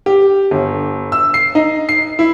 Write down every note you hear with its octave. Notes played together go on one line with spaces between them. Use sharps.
G4
G1
E6
C7
D#4
C7
E4